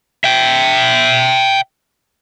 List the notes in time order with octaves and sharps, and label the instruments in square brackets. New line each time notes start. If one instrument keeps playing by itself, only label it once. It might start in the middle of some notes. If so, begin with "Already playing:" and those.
[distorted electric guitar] E5 G5